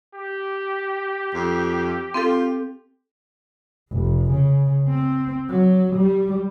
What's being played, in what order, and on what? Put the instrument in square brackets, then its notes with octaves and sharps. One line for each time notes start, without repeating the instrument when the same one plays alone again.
[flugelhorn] G4
[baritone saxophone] F2
[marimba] C4 A4 [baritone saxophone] F4
[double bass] F1
C#3
C4
F#3
G3